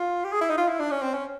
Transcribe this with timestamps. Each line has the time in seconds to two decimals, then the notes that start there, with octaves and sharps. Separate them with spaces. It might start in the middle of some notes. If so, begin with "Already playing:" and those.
Already playing: F4
0.24 G4
0.32 G#4
0.41 E4
0.50 D#4
0.57 F4
0.68 E4
0.80 D4
0.91 C#4
1.02 C4
1.14 C#4